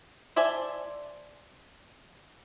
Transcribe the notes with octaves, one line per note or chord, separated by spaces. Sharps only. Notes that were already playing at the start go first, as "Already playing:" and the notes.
C5 D5 E5 G#5 A5